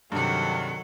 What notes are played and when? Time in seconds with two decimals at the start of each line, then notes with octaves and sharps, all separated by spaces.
0.12 G2 C3 D#3 F#3 A4 F#5